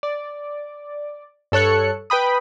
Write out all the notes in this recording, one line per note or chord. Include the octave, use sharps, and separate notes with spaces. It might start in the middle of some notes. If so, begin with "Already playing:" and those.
D5
G2 A4 C#5 F#6 C#7
B4 G5 B5 D#6